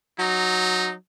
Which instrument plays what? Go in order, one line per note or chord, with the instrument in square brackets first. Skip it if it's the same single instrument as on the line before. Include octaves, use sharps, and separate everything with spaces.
[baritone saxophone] F#3 [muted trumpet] D#4